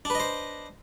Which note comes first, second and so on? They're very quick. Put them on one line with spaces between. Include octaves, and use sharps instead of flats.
D4 B4 D#5 C5